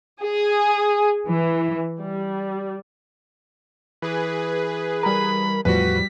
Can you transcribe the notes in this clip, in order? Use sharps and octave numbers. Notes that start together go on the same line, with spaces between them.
G#4
E3
G3
E3 G#4 B4
G3 A#4 B5
E2 A2 F3 G3 F#4 B4 B6